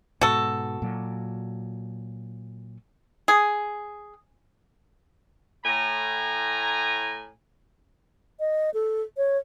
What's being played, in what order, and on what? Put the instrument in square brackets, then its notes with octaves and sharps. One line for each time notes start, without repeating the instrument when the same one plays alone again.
[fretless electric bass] G#2 B2 [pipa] F#4 A4
[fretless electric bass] A#2 F#3
[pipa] G#4
[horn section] A2 G#5 A#5
[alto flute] D#5
A4
C#5